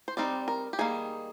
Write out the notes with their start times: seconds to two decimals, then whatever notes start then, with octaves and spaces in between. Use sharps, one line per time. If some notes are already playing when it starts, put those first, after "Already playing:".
0.08 C5
0.17 G3 C4 D#4 D5
0.48 A#4
0.73 G4
0.79 D#3 G3 A#3 G#4